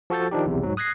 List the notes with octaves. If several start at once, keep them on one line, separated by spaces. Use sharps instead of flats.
F3 F#4 A4 G6 A6
D#3 F3 D4 D#4 G4
B1 E2 C3
G#2 F#3
D#6 F#6 G#6 A#6 C7